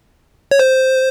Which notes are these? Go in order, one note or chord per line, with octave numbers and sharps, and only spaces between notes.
C#5
C5